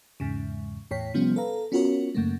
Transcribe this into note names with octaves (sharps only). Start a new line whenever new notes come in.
E2 G#2 C#3
E2 A2 C#5 G5 B6
C3 F3 G3 B3 C#4
A4 B4 F5 A#5
B3 C#4 F4 F#4 A#4 C#5
F#2 C#3 A3 A#3